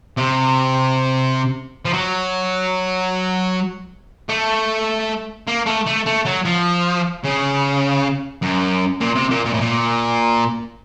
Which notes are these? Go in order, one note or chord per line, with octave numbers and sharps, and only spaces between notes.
C3
F3
F#3
A3
A#3
A3
A3
A3
F#3
F3
C#3
F#2
A#2
C3
A#2
A#2
A2
A#2